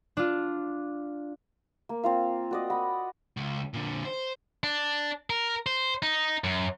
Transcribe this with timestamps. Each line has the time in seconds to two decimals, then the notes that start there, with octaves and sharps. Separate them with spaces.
0.17 D4 F4
1.89 A#3
2.03 C4 F4 F5
2.51 F#4 D5 D#5
2.70 F#5 B5
3.37 C#2
3.74 A#2 D3
4.05 C5
4.64 D4
5.30 A#4
5.66 C5
6.03 D#4
6.44 F#2